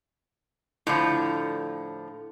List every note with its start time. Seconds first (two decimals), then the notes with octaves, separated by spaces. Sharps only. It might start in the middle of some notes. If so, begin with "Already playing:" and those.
0.87 A2 D3 F3 E4